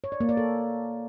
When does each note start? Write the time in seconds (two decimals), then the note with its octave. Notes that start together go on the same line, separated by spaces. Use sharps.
0.04 C#5
0.12 D5
0.20 A#3
0.29 D5
0.37 A4